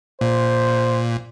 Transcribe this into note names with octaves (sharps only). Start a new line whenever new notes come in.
A#2 C5